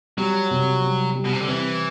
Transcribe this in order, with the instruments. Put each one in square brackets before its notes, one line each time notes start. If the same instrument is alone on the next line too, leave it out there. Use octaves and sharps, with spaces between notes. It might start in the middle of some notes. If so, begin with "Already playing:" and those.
[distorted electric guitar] F#3 [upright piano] G3
[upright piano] C3
G3
G3
[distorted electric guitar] B2
C3
D3
[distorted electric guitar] E3 [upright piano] C4